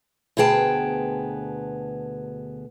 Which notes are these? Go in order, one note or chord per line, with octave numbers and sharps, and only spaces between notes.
D2 B2 B3 G#4 G5 A5